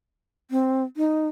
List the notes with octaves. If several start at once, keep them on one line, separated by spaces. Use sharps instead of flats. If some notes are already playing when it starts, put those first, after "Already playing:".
C4
D#4